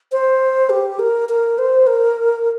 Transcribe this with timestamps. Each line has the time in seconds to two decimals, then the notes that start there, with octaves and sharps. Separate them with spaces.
0.12 C5
0.70 G4
0.99 A#4
1.29 A#4
1.58 C5
1.87 A#4